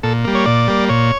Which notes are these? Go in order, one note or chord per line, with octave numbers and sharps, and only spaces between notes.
A#2 A4
G3 A#3
C#5
A#2 D5
G3 A#3
A#2 C#5